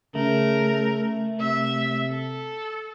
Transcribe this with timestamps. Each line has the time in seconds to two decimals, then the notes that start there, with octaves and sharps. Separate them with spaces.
0.15 C#3 A3 A#4
1.40 C3 E5
2.10 A4